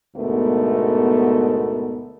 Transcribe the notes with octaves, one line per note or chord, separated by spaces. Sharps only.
D2 G#2 B2 A3 B3 A#4